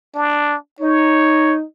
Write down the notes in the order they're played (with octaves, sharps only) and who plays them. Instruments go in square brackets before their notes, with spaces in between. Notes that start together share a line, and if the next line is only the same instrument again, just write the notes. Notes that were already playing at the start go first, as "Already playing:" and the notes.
[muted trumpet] D4
[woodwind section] D#4 [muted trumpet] C#5